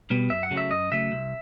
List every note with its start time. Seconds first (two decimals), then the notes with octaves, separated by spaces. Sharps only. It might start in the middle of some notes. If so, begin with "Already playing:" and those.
0.10 B2 G3 B3
0.30 F#2 E5
0.43 F#5
0.51 C#3 F#3 A3
0.57 E5
0.71 F#2 D#5
0.92 C#3 F#3 A3 E5
1.12 C2